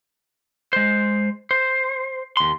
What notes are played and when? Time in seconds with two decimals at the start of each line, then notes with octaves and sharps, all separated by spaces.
0.73 G#3 C5
1.51 C5
2.37 D#2 C6